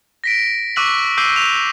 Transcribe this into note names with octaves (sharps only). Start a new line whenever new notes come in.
A#6 B6 D7
C#6 D6 E6 F#6 B6 F#7
D6 E6 G6 C7 D#7 G7
F7